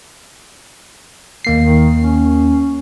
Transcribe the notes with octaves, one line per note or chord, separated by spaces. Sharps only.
D#2 A#3 C7
D#3
C#4